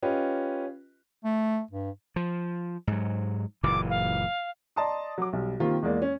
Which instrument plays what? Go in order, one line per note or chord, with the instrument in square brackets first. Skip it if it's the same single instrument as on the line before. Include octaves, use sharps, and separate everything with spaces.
[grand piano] C#4 F4 G4 B4 D#5
[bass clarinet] A3
G2
[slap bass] F3
G#2 F#3
[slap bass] F#1 A#2 E3 [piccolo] D6
[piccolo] F5
[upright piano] D5 D#5 A5 A#5 C6 D#6
F#3 D6
B1 G3
D#3 A#3 C4 F4 G4 A#4
E2 G#3 A#3 D5
C#4